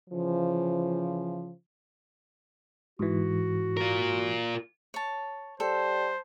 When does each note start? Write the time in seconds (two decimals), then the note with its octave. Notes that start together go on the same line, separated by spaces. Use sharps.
0.10 C#3 E3 F3
2.99 G#2 E3 F#4
3.77 F4 A#4
4.94 C#5 A5
5.60 G3 A4 C5